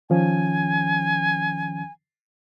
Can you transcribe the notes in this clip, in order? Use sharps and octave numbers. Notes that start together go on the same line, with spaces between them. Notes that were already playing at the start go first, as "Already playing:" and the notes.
D#3 F3 C#4 G#5